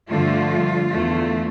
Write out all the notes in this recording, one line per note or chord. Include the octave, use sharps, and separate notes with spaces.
G2 D3 F3 A3 F4
E2 D3 A3